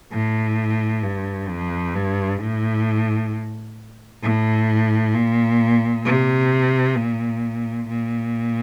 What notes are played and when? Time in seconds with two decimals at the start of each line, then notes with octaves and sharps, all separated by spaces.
0.12 A2
1.03 G2
1.49 F2
1.95 G2
2.41 A2
4.22 A2
5.14 A#2
6.05 C3
6.96 A#2
7.88 A#2